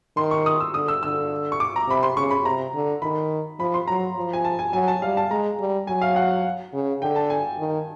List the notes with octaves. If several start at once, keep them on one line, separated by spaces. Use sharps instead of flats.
D#3 C6
C#6
D#6
E6
D3 D#6
E6
D3 E6
C#6
D6
A#5
C3 B5
C6
C#3 C#6
B5
C3 A#5
D3
D#3 B5
F3 B5
C6
F#3 A#5
F3
G#5
A5
G#5
F#3 G#5
A5
G3 F5
A5
G#3 A#5
G3
F#3 G#5
F5
F#5
C#3
D3 G5
A5
G#5
D#3